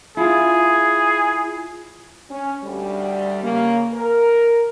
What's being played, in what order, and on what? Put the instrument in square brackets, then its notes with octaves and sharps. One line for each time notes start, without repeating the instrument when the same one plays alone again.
[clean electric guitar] E4 F4 [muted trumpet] G#4
[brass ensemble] C#4
D2 G3
C#3 A#3
A#4